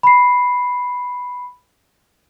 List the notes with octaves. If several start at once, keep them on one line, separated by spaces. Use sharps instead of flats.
B5 C7